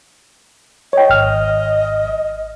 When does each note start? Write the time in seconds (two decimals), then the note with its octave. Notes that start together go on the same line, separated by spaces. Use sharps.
0.93 C#5 D#5 G5
1.10 G#1 F6